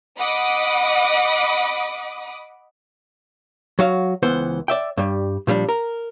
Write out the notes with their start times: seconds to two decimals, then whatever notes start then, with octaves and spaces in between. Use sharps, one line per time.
0.19 D#5 F#5 B5 D6 D#6
3.79 F#3 F#4 F5
4.23 C#2 E3 B3 C5
4.68 D5 E5 G5
4.97 G2 G3
5.47 A#2 F3 G3 D4
5.69 A#4